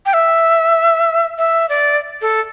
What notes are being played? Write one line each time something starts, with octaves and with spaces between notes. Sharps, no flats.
G5
E5
E5
D5
A4